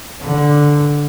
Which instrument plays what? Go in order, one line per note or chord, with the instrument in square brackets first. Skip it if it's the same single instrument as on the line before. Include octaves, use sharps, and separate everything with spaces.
[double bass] D3